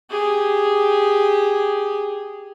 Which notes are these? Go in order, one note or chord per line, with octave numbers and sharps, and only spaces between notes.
G4 G#4